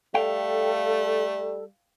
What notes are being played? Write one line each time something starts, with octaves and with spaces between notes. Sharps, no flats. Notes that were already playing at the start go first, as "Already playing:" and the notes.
G3 A3 A4 F5 G5